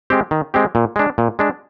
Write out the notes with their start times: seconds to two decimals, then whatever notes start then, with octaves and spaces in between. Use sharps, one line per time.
0.10 G#3 C4 G4
0.31 D#3
0.54 G#3 C4 G4
0.75 A#2
0.96 G#3 D4
1.18 A#2
1.39 G#3 D4